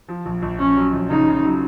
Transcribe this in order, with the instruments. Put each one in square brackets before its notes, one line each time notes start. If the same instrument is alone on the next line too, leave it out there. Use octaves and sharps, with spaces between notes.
[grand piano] F3
A#1
A#1
[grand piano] A#1 [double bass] C#4
[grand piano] F#3
A#1
[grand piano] C#3 [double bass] D#4
[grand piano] C#3
F#3